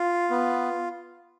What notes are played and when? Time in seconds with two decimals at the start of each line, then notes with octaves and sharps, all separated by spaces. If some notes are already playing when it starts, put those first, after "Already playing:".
Already playing: F4
0.30 B3